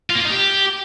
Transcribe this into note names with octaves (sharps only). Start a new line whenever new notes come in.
F4
A#3
F4
D#4
G4